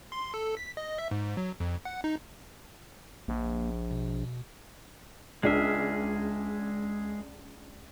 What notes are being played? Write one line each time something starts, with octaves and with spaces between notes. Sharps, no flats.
C6
A4
B6
D#5
E5
G#2
F#3
F2
F#5
D#4
A#1 A#3
B2
C#2 G#3 D4 G#4 E5 F6